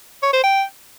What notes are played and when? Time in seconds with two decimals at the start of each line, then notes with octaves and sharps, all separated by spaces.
0.23 C#5
0.33 C5
0.44 G5